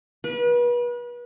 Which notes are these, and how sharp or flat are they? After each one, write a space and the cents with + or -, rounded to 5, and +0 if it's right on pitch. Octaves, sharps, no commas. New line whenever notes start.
B4 -35